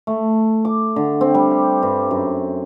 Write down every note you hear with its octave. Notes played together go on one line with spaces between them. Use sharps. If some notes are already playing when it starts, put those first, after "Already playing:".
A3
D6
D3
C4
G3
G4
G2
F#2